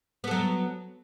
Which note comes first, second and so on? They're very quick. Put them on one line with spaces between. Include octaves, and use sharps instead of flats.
B3 A4 F#3